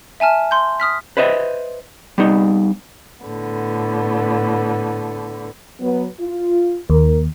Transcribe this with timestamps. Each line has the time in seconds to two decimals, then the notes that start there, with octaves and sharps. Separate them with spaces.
0.20 E5 G#5 A5 F6
0.51 C6 G6
0.80 D#6 F6 B6
1.17 B4 C5 D#5 E5
2.18 G3 B3 D#4
3.25 A2 D3 B3
5.80 F#3 B3
6.19 F4
6.90 D#2 A#4